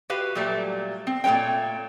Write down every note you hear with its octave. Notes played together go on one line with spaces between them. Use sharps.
F#4 G4 B4 F5
A#2 F#3 G3 A3
C4
A#2 A3 A#4 C#5 G5